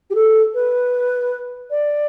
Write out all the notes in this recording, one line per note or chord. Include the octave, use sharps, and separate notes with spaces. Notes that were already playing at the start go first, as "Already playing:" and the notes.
G4
A4
B4
D5